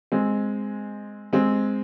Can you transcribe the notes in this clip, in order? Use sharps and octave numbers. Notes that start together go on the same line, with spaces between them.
G#3 C4
G#3 C4